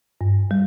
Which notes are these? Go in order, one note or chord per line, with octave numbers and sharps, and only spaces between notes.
G2
G3